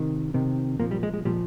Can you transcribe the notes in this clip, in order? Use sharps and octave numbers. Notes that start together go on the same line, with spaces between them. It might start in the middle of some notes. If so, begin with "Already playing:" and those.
Already playing: C3 D#3
C3 D#3
A#2 F3 A#3
G3
G#3
G#3
A#2 F3 G3